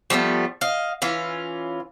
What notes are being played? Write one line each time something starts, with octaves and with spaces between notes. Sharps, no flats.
F3 G3 A3 B3
D#5 F5
E3 C#4 F4